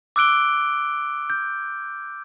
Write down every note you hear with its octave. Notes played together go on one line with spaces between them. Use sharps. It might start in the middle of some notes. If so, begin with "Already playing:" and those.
D6 E6 F#6 D7 G7
G6